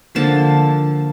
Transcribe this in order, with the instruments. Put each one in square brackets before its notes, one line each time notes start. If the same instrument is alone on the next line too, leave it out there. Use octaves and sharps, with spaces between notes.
[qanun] D3 F3 A#3 A5